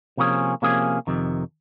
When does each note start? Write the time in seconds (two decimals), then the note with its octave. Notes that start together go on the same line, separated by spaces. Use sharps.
0.17 C3 F3 A#3 C#4 G#4
0.62 C3 F3 A#3 C#4 G#4
1.07 F2 C3 D#3